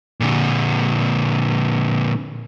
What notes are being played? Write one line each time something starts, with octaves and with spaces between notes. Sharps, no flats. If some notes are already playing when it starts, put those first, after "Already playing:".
A#2 D3